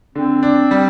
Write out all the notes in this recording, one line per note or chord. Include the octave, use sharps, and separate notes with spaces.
D3 C4
D4
G3